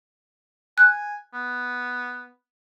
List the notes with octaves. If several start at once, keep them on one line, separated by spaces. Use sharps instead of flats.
G#5 F#6
B3